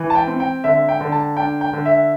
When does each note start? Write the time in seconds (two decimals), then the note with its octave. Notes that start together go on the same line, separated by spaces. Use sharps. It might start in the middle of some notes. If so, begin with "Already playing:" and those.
Already playing: E3
0.10 A5
0.15 G5
0.27 C4
0.40 G5
0.64 D3 E5
0.89 G5
1.01 D3
1.12 A5
1.37 D4 G5
1.61 G5
1.73 D3
1.85 E5